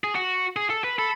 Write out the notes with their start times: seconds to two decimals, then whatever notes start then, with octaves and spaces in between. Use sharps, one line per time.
0.04 G#4
0.15 F#4
0.56 G#4
0.70 A4
0.84 B4
0.98 A4 B5